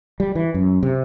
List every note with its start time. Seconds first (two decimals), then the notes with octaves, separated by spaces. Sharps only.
0.20 G3
0.35 E3
0.54 F#2
0.83 C3